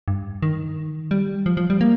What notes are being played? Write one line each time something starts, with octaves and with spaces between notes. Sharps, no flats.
G2
D#3
G3
F3
F3
G3
A#3